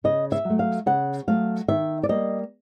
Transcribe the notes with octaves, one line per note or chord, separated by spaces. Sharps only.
C#3 D#5
E5
F#3 A3
F5
C#3 F#5
F#3 A3 F5
D#3 E5
D5
G3 A#3 D#5